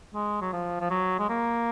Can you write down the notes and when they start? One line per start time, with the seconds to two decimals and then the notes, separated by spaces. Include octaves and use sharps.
0.14 G#3
0.41 F#3
0.52 F3
0.80 F3
0.90 F#3
1.19 G#3
1.29 A#3